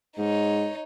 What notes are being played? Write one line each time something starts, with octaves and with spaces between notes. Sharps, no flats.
G#2 D#4 C#5